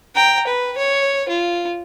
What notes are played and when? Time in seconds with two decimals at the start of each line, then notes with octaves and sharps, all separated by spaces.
0.15 G5 A#5
0.47 B4
0.77 C#5
1.28 F4